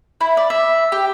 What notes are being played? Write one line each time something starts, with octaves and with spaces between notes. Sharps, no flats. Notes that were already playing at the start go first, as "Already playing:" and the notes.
E4
D5
E5
G4